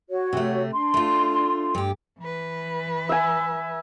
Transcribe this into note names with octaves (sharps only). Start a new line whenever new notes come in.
F#4 C#5
C3 A3
D4 C6
A3 F4
G2 G4
E3 B4
E5 G#5